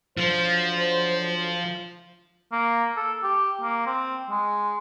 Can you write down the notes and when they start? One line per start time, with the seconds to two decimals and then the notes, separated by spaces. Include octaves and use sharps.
0.18 D3 F3 F#3 C5
2.52 A#3
2.97 A4
3.23 G4
3.61 A#3
3.86 C4
4.30 G#3